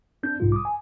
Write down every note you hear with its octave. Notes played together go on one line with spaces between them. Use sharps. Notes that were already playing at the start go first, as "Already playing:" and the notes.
C4 D4 G6
B1 G#2 C3 G3 F4
D6 D#6
G#5